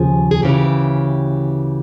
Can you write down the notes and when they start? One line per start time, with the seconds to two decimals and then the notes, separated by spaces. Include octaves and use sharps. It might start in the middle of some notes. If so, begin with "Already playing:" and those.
Already playing: D#2 C#3 F3 G#4
0.31 G#4
0.42 D2 C#3 E3 G4